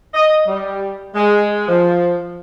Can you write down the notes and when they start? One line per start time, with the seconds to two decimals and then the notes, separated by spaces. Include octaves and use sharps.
0.14 D#5
0.48 G3
1.15 G#3
1.69 F3